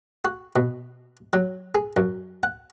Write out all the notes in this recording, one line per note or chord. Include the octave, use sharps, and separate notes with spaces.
F#4
B2
F#3
G#4
F#2
F#5